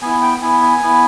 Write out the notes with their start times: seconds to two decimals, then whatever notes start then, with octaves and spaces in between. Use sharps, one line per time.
0.02 B3 E4 G#5
0.22 G5
0.42 B3 E4 G#5
0.62 G#5
0.82 B3 E4